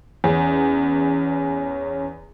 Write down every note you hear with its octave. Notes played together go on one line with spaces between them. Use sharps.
E2 C#4